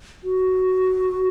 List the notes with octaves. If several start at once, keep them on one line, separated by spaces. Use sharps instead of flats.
F#4